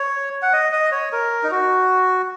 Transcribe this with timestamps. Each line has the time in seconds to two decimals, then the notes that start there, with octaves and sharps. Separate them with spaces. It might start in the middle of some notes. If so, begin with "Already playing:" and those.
Already playing: C#5
0.42 F#5
0.53 D#5
0.72 D#5
0.92 C#5
1.12 A#4
1.43 D#4
1.51 F#4